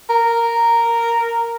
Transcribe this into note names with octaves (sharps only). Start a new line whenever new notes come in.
A#4